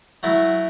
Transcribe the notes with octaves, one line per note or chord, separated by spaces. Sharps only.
F#3 A3 E4